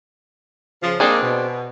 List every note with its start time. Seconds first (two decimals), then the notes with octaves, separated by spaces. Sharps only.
0.83 C#3 F3
1.00 A#3 C4 D4 D#4 G#4
1.21 B2